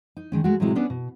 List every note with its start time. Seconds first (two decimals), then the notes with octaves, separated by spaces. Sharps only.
0.17 D#4
0.32 D#3 G#3 C#4
0.44 G#3 A3 F#4
0.60 A2 C3 F#3 G#3 E4
0.75 B3 C#4 D4
0.90 B2